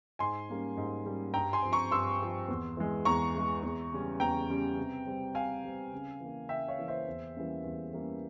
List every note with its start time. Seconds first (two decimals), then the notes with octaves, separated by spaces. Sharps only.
0.19 G#2 G#5 C6
0.49 G3 A#3 C#4
0.77 G#2
1.06 G3 A#3 C#4
1.34 G2 G5 A#5
1.53 G#5 C6
1.62 F3 C4
1.72 A#5 C#6
1.91 G2 C6 E6
2.20 F3 C4
2.48 E2
2.77 E3 G#3
3.05 E2 A#5 C#6
3.35 E3 G#3
3.63 E2
3.92 C#3 G3 C#4
4.20 E2 G5 A#5
4.49 C#3 G3 C#4
4.78 C3
5.06 G3 C4
5.35 C3 F5 G#5
5.64 G3 C4
5.92 C#3
6.20 E3 A#3
6.49 C#3 E5 G5
6.68 C#5 F5
6.78 E3 A#3
6.88 C5 E5
7.07 E2
7.36 E3 G3 A#3 C#4
7.64 E2
7.93 E3 G3 A#3 C#4